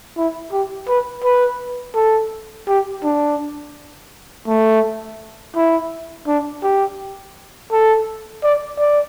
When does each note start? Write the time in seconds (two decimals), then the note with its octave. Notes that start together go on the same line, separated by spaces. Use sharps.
0.17 E4
0.52 G4
0.88 B4
1.24 B4
1.95 A4
2.68 G4
3.03 D4
4.47 A3
5.55 E4
6.27 D4
6.63 G4
7.72 A4
8.43 D5
8.78 D5